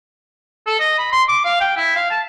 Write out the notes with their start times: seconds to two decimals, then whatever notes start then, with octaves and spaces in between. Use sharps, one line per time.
0.67 A4
0.79 D#5
0.98 B5
1.12 C6
1.29 D6
1.45 F5
1.61 G5
1.77 E4
1.96 F5
2.11 A5